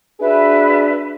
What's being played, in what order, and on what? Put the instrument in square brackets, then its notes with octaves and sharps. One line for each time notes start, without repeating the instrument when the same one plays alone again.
[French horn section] D4 F#4 G#4 [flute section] B4 E5